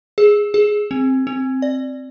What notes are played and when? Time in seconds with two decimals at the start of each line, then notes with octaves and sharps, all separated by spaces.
0.18 G#4
0.54 G#4
0.91 C4
1.27 C4
1.62 D5